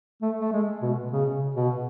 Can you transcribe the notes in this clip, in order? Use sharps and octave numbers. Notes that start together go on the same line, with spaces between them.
A3
A3
G#3
B2
C#3
B2